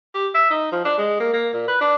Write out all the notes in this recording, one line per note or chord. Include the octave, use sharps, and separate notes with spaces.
G4
E5
D#4
F3
D4
G#3
A#3
A#3
A#2
B4
D4